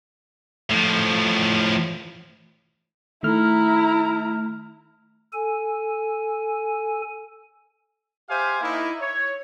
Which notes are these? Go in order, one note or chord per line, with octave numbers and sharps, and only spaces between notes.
A2 F3
D#3 A3 E4 A#5 F6
A4 G#5
G4 C5 E5 F5 G#5
A#3 D#4 E4
C#5